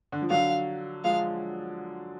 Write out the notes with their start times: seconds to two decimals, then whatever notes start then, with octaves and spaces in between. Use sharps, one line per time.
0.12 D3
0.22 F3
0.30 D3 F#3 F5
1.04 F3 G#3 F5